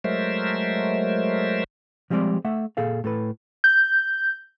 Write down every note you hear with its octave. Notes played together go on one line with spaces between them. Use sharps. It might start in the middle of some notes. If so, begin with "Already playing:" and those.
F#3 G#3 A3 A#4 C5 E5
F3 G3 G#3 C4 D5
A3 E5 F#5
A#2 G#4 A4 F5
A2 A4 B4
G6